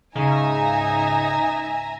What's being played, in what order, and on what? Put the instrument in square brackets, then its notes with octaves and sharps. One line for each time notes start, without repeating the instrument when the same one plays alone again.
[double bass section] C#2 G#2 [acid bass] C#3 [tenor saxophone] D#4 [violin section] E5 G#5 A#5